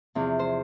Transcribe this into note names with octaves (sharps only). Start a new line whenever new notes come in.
E2 C3 F3
C5